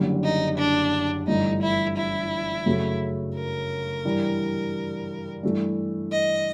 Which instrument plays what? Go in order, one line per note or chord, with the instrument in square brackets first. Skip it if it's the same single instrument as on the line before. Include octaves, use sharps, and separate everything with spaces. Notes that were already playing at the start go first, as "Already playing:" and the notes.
Already playing: [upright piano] F#1 F#2 D3 G3
[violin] D#4
D4
[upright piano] G1 G2 E3 A3 [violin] D#4
[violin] E4
E4
[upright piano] F#2 C#3 F#3 A3
[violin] A#4
[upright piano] G2 E3 G3
G2 E3 A3
[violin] D#5